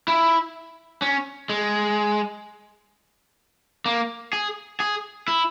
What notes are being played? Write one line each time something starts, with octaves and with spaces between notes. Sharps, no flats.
E4
C#4
G#3
A#3
G#4
G#4
E4